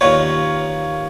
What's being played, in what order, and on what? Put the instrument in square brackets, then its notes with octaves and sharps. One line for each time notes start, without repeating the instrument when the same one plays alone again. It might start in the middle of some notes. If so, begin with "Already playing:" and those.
[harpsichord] D#2 D#3 A#3 F4 B4 [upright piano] C#5